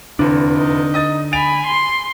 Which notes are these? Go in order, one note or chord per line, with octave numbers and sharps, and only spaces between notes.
F1 E2 D3 D4
D#4
D#5 D#6 A6
G#5 B5 A6 D7 F7
C6